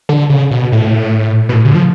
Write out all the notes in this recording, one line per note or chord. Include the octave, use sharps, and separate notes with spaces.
D3
C#3
B2
A2
B2
A2
C#3
D3
F3